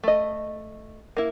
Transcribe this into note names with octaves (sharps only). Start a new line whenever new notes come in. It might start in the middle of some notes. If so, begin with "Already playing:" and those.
A3 D#5
A#3 E4